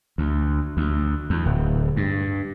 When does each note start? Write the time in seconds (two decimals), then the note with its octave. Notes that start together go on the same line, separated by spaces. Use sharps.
0.18 D2
0.77 D2
1.30 E2
1.46 D1
1.97 G2